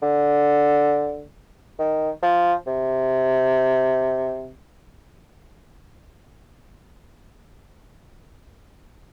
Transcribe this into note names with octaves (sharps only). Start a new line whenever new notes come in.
D3
D#3
F3
C3